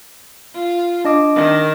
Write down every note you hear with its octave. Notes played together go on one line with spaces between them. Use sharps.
F4
D4 D#5 D6
D#3